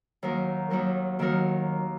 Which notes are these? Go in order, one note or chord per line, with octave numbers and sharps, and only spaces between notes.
D#2 D#3 F#3 D#4 A#4
D#2 D#3 F#3 D#4 A#4
D#2 D#3 F#3 D#4 A#4